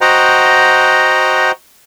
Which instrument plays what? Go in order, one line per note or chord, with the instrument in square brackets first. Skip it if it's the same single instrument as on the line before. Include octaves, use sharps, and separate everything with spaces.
[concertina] F#4 C5 D#5 F#5 G5 A#5